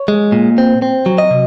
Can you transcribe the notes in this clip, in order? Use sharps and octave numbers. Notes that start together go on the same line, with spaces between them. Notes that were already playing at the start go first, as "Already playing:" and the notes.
Already playing: C#5
G#3
A#2
C4
C4
F#3
D#5
C3